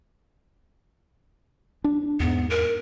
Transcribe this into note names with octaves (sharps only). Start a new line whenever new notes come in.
D4
E2 G#2 B3
A#4